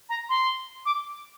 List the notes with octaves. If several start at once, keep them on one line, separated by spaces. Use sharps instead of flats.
A#5
C6
D6